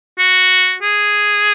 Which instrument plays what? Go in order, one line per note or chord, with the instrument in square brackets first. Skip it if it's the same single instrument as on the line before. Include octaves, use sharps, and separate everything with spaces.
[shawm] F#4
G#4